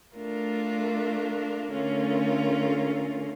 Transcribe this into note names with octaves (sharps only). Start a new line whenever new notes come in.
A3 D4 F4 A#4
D3 A3 C#4 F4 A#4